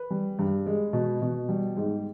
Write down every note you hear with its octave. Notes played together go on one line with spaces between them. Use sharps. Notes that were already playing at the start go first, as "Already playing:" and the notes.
Already playing: B4
G3
G2
G#3
B2
B2
G3
G#2